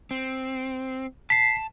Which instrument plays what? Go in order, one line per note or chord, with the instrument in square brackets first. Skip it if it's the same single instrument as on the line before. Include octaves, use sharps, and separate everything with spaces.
[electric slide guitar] C4
[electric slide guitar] A5 [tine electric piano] B6 C7